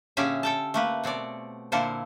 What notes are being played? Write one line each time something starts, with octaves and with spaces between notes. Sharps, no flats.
A#2 D3 C#4 G4 G#4 E5
A4 G5 A5
A3 A#3 B4
B2 C4 C#5 D5
A#2 D3 A#3 E4 A4 C5